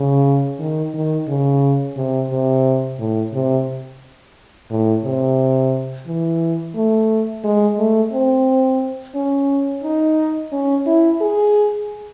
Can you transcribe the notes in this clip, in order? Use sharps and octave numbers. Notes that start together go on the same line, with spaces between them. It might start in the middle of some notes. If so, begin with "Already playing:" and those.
Already playing: C#3
D#3
D#3
C#3
C3
C3
A2
C3
A2
C3
E3
A3
G#3
A3
C4
C#4
D#4
C#4
E4
G#4